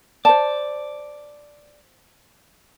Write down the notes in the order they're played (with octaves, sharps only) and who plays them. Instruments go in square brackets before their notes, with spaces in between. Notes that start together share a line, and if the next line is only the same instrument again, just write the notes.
[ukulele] C5 A5 [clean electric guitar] D5